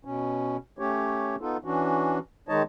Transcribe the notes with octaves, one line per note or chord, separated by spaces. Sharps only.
B2 C#4
A3 C#4 G4 C#5
B3 D#4 F4 A4
E3 C#4 D4 F#4
D#3 G#3 D#4 C#5 D#5 A5